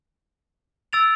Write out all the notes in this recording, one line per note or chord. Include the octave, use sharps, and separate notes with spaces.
E6 A6 D7 F7